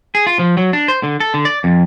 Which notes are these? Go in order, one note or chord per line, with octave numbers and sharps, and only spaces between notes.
G#4
F4
F3
F#3
D4
C5
D3
A4
D3
D5
F2